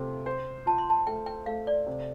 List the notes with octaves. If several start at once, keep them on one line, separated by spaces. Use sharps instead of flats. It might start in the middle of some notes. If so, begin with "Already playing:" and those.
Already playing: C3 A3 F4
C5 G5
F4 A5
C6
A5
A3 G5
G5
A3 F5
D5
C3